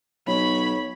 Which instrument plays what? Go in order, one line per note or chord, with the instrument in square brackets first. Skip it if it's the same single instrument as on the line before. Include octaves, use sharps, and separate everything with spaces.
[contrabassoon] B1 [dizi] C#5 [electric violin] B5